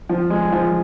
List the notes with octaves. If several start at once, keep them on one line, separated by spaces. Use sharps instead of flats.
F3
G#3
F3